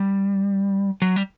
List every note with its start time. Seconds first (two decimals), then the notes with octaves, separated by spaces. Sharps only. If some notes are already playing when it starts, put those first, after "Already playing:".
Already playing: G3
1.02 F#3
1.16 G3